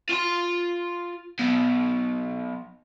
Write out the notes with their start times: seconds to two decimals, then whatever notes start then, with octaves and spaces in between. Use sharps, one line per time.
0.10 F4 C6
1.39 F#3 B3